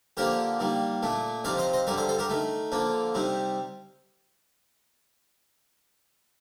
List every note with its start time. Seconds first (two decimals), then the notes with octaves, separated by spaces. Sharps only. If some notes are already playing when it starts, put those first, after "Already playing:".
0.17 D3 F3 A#3 D4 G4 A#4
0.60 D#3 G3 A#3
1.03 A#2 A3 D4
1.44 C3 F3 C4 D#4 D5 F5
1.58 C5 D#5
1.73 C5 D#5
1.87 G2 D3 G3 A#4 D5
1.97 A4 C5
2.08 A4 C5
2.19 G4 A#4
2.29 D#3 A3 D#4
2.72 D3 F3 A#3 D4
3.14 C3 G3 C4 D#4